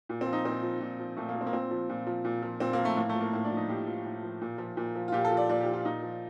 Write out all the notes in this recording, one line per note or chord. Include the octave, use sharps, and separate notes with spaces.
A#2
C4
F3
D#4
A#2 C4
F3
A#2
F3
A#2 A3
A#3
F3
C4
A#3
A#2 C4
F3
A#2
F3
A#2
F3
A#2 C4
A#3
F3
A3
A2 A#3
A3
F3
A#3
A2 A#3
D4
F3
D#4
A2 G4
F3
A2
F3
A#2
F3
A#2
F3
F4
A#2 G4
A4
F3
D5
A#2 D5
G4
F3
F4
A#2 D#4
F3